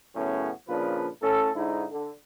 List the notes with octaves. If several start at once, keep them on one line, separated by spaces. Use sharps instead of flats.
F#2 A2 C#3 B3 C#4
A#2 C#3 F3 D4 B4
A2 C#4 A4
G#2 D3 D#4 E4
D3